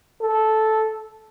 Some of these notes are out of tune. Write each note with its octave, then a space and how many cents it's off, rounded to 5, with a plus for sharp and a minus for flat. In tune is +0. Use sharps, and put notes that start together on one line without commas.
A4 -10